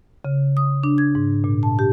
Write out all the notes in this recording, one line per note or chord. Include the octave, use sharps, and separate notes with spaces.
C#3
D#6
D4
G#6
G#2
A#2
A5
G4